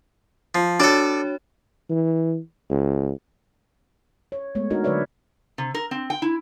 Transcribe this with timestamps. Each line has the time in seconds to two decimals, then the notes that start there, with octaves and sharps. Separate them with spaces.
0.55 F3
0.80 D4 F#4 A4 C#5 D5
1.90 E3
2.70 C#2
4.32 C#5
4.55 G#3 A3 B3 C#5
4.70 D4 D#4 F#4 A#4 D#5
4.84 D3 F#3 B4 C#5 D5 E5
5.58 C3
5.74 A#4
5.91 C4
6.10 G5
6.22 E4